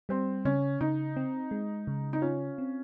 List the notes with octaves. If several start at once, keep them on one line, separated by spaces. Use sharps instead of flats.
G3 C4
C#3 C#4
C#3 D#4
C4
G#3
C#3
D#4
C#4 F4
C4